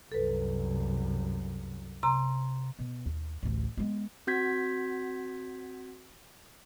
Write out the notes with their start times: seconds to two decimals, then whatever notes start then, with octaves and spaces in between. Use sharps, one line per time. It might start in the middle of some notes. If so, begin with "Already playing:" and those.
0.12 C2 F#2 A4 B4
2.03 C3 A#5 C6
2.79 B2
3.05 D#2
3.43 A1 D2
3.77 G#3 B3
4.27 C4 F#4 G6 G#6 B6